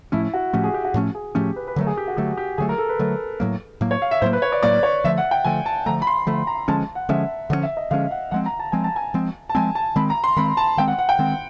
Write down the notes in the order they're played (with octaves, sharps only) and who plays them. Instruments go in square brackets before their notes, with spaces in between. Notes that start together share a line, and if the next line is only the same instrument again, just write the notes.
[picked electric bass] A2 F3 A3 C#4 [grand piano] E4
[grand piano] F#4
[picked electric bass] A2 F3 A3 C#4 [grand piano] G4
[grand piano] G#4
G4
F#4
[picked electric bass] A2 F3 A3 C#4
[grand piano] G#4
[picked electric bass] A2 F3 A3 C#4 [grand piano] G4
[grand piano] B4
B4
[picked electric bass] D3 F#3 A3 [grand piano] A#4
[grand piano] G#4
G4
F#4
[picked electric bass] D3 F#3 A3 [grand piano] G4
[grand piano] G4
[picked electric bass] D3 F#3 A3 [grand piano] G#4
[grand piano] A#4
A4
B4
[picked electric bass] D3 F#3 A3
A2 F#3 A#3
A2 F#3 A#3
[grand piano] C#5
F5
E5
[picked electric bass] A2 F#3 A#3 [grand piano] C5
[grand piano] B4
C#5
D5
[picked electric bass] A2 F#3 A#3 [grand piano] D5
[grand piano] C#5
[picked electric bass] D3 F3 A3 [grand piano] E5
[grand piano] F#5
G5
[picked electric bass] D3 F3 A3 [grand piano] G#5
[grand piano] A5
[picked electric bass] D3 F3 A3 [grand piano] A#5
[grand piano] B5
C6
[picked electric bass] D3 F3 A3 [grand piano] B5
[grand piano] A#5
[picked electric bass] D3 F3 G#3 C#4 [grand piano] A5
[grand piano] F#5
[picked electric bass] D3 F3 G#3 C#4 [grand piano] E5
[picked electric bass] D3 F3 G#3 C#4 [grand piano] F#5
[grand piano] E5
D#5
[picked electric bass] D3 F3 G#3 C#4 [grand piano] F5
[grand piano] F#5
[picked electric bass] F3 G#3 C4 [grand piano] F#5
[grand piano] A#5
A5
[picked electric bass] F3 G#3 C4 [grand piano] G#5
[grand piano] A5
G#5
[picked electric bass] F3 G#3 C4
[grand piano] A5
[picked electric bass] F3 G#3 C4 [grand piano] G#5
[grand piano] A5
[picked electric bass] D#3 G#3 C4 [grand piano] B5
[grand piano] A#5
C6
[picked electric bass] D#3 G#3 C4 [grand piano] B5
[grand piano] A5
[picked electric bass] D#3 G#3 C4 [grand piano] G5
[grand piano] F#5
F#5
G5
[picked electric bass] D#3 G#3 C4